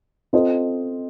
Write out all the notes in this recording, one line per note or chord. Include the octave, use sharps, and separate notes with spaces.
C4 F4 A4 C5 D#5